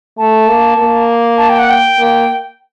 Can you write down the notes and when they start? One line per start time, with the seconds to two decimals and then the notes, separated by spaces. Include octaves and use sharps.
0.18 A3 A5
0.48 A#3
0.78 A#3
1.38 A5
1.50 G5
1.59 F#5
1.70 G5
1.98 A#3